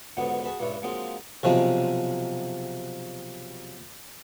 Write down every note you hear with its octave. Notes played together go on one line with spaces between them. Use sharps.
C#2 G#2 D3 F#3 B3
F#4 G#4 A5 B5
C#2 G2 D4 E4 C#5
F3 F#3 G#3 A#3 C4 D#4
B1 C3 F3 G#3